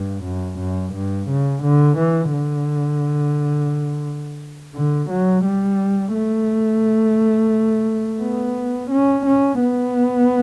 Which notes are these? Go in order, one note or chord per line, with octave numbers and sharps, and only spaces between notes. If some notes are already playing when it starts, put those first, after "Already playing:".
Already playing: G2
F#2
F#2
G2
C#3
D3
E3
D3
D3
F#3
G3
A3
B3
C#4
C#4
B3